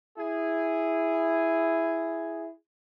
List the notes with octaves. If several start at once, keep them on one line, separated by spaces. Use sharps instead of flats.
E4 G#4